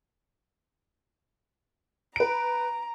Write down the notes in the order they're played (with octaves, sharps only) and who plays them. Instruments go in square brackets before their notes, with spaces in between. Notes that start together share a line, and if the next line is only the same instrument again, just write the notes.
[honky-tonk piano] B4 D7 [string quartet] A#5